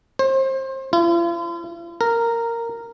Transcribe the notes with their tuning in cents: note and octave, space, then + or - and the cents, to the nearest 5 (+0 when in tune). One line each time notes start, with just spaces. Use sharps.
C5 +30
F4 -45
A#4 -10